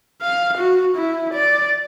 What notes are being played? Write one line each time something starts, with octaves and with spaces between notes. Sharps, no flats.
F5
F#4
E4
D5